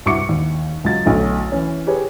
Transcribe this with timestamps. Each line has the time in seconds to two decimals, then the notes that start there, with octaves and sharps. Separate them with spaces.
0.06 C2 G2 F#4 C#6 D6 C#7
0.29 D#2
0.84 C#2 F#3 F4 A6
1.06 B1 D3 F#3 A3
1.52 E3 C#4
1.87 G4 G#4 B4 C#5